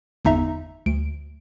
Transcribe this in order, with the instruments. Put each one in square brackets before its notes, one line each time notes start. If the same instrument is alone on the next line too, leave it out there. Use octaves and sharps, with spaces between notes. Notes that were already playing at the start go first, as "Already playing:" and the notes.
[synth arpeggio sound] G1 E2 D#4 E5 A#5
D2 D7